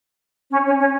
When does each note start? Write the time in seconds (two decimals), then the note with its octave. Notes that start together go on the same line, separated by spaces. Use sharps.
0.51 C#4
0.65 C#4
0.79 C#4